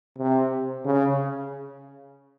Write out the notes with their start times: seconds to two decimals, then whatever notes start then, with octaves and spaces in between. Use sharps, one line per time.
0.18 C3
0.85 C#3